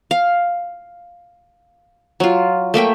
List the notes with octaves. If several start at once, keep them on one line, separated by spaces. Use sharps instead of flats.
F5
F#3 F4
A3 A#3 E5 G5